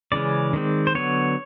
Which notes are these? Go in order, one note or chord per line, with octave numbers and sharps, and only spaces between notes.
C#3 E3 G#3 C#4 D5
D#3 G#3 C4
C5
D3 F#3 B3 C#5